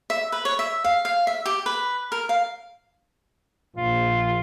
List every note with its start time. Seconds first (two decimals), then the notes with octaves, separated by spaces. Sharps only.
0.10 E5
0.32 B4
0.45 C#5
0.59 E5
0.84 F5
1.05 F5
1.27 E5
1.46 G4
1.66 B4
2.12 A#4
2.29 F5
3.76 A#1 F4